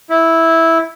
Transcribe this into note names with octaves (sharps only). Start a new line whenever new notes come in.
E4